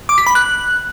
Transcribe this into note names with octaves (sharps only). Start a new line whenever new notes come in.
D6
B6
B5
F#6